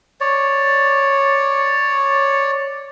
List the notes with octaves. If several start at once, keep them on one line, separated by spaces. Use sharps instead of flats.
C#5 D5